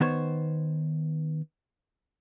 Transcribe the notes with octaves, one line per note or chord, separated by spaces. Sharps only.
D#3 B3 C5 C#5